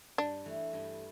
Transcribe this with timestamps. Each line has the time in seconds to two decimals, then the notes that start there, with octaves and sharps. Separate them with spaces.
0.18 G2 D4
0.45 E3 A3
0.73 G2